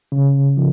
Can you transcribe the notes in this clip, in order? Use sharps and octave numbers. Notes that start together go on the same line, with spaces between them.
C#3
F3